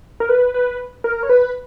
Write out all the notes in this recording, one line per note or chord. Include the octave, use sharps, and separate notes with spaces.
A#4
B4
B4
A#4
C#5
B4